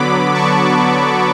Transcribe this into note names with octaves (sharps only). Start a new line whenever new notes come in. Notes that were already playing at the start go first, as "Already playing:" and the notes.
Already playing: D3 F#3 B3 B5 D6
A5 C#6